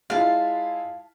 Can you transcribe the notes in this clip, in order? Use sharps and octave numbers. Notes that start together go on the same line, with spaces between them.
G#3 E4 F4 F5 A5